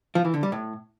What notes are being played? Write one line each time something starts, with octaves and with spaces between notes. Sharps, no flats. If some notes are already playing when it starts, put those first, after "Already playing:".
F3
E3
D3
G3
A2